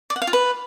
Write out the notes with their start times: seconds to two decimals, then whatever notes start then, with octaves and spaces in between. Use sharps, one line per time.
0.10 D5
0.16 F#5
0.22 F5
0.27 F4
0.33 B4